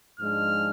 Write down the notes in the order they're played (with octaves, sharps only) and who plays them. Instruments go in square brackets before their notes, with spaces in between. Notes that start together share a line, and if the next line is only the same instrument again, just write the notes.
[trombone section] G#2 F3 G#3 D4 [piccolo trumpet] F6